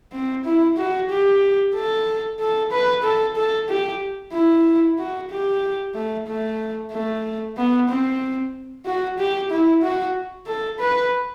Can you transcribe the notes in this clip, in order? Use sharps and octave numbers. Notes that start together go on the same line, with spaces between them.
C4
E4
F#4
G4
A4
A4
B4
A4
A4
G4
E4
F#4
G4
A3
A3
A3
B3
C4
F#4
G4
E4
F#4
A4
B4